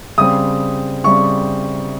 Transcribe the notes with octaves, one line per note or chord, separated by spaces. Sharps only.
C#3 G3 C4 D#6
C#3 G3 C4 C#6